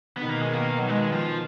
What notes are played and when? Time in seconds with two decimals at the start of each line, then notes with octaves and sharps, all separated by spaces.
0.18 B2 D#3 B3
0.29 A#3
0.42 G#3
0.54 A#3
0.79 F#3
0.89 G#3
1.12 F3